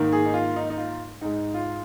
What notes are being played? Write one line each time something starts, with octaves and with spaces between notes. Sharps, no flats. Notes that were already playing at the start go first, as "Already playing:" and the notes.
Already playing: G#2 D#3 A#3
G#4
D#4
F4
D#4
D#4
F4
G#2 G#3 D#4
F4